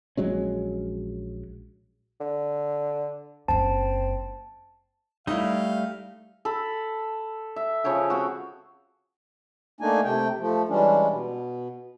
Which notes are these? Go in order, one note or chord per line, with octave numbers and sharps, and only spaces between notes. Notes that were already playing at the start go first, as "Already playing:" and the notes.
A#1 F#3 G#3 C#4
D3
F#1 F#2 C4 A5
G3 A3 D#4 E4 F5
A4 B5
E5
C#3 F3 C#5 G5
C4 F#4
A3 A#3 D4 D#4 G#5
C3 A3 G5
F3 A3
E3 G3 G#3 C#4 D4
B2